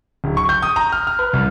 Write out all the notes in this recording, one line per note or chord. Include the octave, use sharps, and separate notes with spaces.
D1
C#6
G6
D#6
A#5
F6
F6
B4
C2